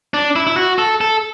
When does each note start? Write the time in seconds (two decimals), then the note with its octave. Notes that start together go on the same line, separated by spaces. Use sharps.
0.14 D4
0.36 E4
0.47 E4
0.57 F#4
0.78 A4
1.01 A4